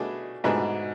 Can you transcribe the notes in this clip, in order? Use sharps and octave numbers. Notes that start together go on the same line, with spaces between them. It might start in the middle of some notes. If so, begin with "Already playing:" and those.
Already playing: B2 A3 D4 G#4 B4
G#2 B2 A3 D4 G#4 B4